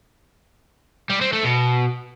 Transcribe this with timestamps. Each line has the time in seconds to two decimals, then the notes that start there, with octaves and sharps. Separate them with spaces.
1.10 G3
1.21 C4
1.33 A3
1.44 B2